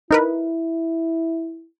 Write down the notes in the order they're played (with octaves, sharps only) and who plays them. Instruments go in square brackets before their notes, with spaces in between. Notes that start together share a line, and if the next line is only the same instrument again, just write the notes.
[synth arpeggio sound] D#4 A#4 B4 [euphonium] E4